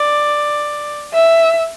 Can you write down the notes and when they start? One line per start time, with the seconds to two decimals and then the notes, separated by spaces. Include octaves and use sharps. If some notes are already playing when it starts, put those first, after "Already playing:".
Already playing: D5
1.14 E5